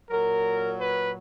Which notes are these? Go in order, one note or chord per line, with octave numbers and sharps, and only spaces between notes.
A#2 F#3 A#4
B4